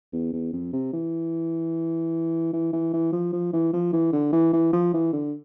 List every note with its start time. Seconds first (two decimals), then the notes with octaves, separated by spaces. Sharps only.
0.13 E2
0.33 E2
0.53 F2
0.73 C3
0.93 E3
2.53 E3
2.73 E3
2.93 E3
3.13 F3
3.33 F3
3.53 E3
3.73 F3
3.93 E3
4.13 D3
4.33 E3
4.53 E3
4.73 F3
4.93 E3
5.13 D3